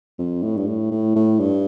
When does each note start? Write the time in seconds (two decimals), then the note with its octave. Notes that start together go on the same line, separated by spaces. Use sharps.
0.18 F2
0.42 A2
0.57 G2
0.67 A2
0.91 A2
1.16 A2
1.40 G2